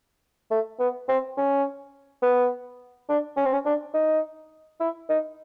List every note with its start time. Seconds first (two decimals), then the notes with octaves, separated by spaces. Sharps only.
0.51 A3
0.80 B3
1.09 C4
1.38 C#4
2.23 B3
3.09 D4
3.37 C#4
3.45 C4
3.53 C#4
3.65 D4
3.94 D#4
4.80 E4
5.09 D#4